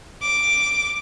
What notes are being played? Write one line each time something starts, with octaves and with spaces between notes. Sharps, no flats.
D6